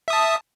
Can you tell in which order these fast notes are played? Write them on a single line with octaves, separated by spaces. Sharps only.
E5 D#6 A5